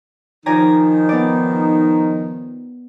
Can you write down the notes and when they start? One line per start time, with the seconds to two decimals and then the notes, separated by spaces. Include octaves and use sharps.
0.46 D#3 F3 D#4 D5 G#5 A#5
1.09 B3 D5